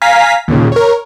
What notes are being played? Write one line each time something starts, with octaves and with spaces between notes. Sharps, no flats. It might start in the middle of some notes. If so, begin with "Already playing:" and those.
F5 G#5 A#5 B6
D#2 A#2 C#3
A#4 C#5